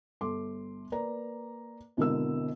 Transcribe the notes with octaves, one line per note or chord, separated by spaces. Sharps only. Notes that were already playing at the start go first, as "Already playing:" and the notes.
G1 A4 C6 D6
A#3 A#4 B4 D5 A#5
G#1 B2 D3 E4 A#4 E6